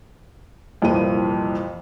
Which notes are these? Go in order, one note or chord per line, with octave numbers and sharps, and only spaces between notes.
C2 F2 A#2 E3 A#4 D#7